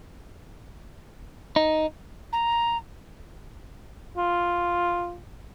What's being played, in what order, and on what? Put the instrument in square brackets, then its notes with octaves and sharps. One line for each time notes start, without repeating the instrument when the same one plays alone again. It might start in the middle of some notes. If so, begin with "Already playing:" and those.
[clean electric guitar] D#4
[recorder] A#5
[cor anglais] F4